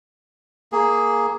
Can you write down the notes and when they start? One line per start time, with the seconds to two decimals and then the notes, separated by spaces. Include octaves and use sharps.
0.72 A#3 G#4